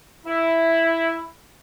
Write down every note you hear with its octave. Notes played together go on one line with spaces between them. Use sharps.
E4